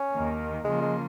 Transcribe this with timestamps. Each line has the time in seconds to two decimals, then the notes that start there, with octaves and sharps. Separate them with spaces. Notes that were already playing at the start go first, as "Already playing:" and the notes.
Already playing: C#4
0.11 D#2 D#3 A#3
0.64 C#3 F3 G#3 A#3 F4
0.82 G#3